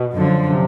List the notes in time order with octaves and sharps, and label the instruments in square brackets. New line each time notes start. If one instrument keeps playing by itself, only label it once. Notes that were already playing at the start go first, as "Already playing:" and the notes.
Already playing: [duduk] B2
[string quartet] F#2 D3 F3
[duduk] C3